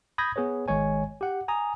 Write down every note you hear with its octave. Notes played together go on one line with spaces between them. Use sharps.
B5 D#6 G6 G#6 A#6
B3 G#4 B4 C#5
G#1 D#3 G#3 C#5 G#5
G4 F#5
G#5 A#5 D#6